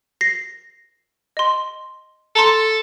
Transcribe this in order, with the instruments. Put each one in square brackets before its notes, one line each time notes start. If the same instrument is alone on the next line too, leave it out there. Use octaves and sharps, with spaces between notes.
[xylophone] A#6 C7
D#5 C6
[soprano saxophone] A4 [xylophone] A5 A#5 C6